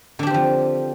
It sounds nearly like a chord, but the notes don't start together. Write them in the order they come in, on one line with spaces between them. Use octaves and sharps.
D3 D4 G4 C4 F3